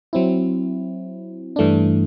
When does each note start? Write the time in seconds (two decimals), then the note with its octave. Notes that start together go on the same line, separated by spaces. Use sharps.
0.13 F#3 C4 E4
1.56 G2 E3 A3 D4